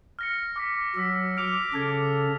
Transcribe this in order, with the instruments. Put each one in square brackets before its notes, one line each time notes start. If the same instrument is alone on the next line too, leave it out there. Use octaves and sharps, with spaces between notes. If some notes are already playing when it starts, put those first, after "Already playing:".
[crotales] F6 A#6 C#7
D6 F6 B6
[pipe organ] F#3 [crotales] D6 E6 B6
[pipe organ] D6 [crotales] F6 F7
[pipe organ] C#3 A4 [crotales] F6 G#6